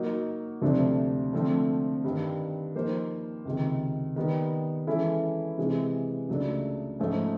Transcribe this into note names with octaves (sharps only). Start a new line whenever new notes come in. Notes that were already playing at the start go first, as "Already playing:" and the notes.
Already playing: F#3 A#3 D#4 F#4
D2 C3 F3 A3 D4
D3 F3 A3 C4
G2 D#3 G3
F3 A#3 D#4 G4 C5
C#2 C3 D#3
D#3 G3 B3
E3 G#3 C#4 E4 A4
C3 E3 G#3
C#2 C#3 F#3 A3 D4
G#2 F3 A3 C#4